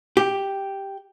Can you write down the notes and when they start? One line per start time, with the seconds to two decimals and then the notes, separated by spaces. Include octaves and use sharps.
0.17 G4